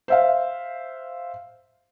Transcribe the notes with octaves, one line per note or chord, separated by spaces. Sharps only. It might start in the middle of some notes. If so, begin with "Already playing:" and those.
C5 E5 F5